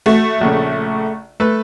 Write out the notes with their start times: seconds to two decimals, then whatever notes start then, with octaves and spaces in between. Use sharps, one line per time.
0.06 A3 F#4
0.41 A#1 C#3
1.40 A3 A4 B4